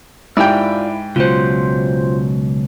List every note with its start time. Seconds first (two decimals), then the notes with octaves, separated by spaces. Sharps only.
0.37 G#2 E4 F4 G4 D5 E5 G5
1.16 C#2 B2 F#3 F4 C5